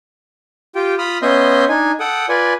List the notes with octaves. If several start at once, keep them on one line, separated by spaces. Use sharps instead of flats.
F4 G4 G5
F4 B5 D#6 F6
B3 C#4 D#5 E5 C6 G6
D4 D#4 G#5
A4 F#5 G5 D#6
F4 B4 D5 G#5